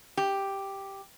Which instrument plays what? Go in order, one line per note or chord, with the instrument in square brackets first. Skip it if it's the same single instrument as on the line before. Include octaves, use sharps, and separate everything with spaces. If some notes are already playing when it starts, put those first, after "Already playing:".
[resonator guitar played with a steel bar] G4